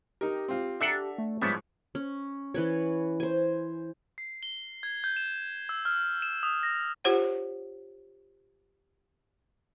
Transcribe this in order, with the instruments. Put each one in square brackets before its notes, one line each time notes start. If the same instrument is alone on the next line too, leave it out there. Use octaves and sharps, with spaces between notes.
[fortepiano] D#4 A#4 [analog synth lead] G4
[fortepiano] C4 F4
[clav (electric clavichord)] D4 A4 F#5 [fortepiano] E5 A#5
[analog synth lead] A3
[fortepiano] G#2 F3 C#5 [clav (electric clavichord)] G3 B3 E5
[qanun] C#4
E3 B4 C#5
C5 G#5
[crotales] C7
G7
G#6
G6
E7
E6
F6
E7
D#6
A#6
[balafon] F4 G4 C5 C#5 F#5